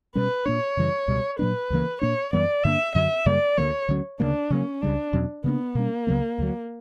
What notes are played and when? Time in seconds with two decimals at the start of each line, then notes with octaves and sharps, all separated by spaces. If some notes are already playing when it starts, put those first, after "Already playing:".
0.15 B2 G3 C#4 B4
0.46 A#2 A#3 D4 C#5
0.77 F#2 C#3 E3 G3
1.08 C#2 B2 G3
1.39 A#2 F#3 A#3 D4 B4
1.70 C#2 C#3 E3 A#3
2.02 A#2 A#3 D4 C#5
2.33 F#2 E3 G3 B3 D5
2.63 G2 D3 A#3 D4 E5
2.95 F#2 D3 F#3 E5
3.26 F#2 C#3 G3 A#3 D5
3.57 D2 D3 G3 A#3 C#5
3.89 D2 D3 F#3 C#4
4.20 D2 C#3 F#3 A#3 D4
4.50 C#3 F#3 A#3 C#4
4.82 C#2 C#3 G3 D4
5.13 E2 B2 F#3 C#4
5.44 C#3 E3 A#3 B3 D4
5.75 B2 G3 A#3 C#4
6.07 C#2 C#3 F#3 B3
6.38 D2 D3 F#3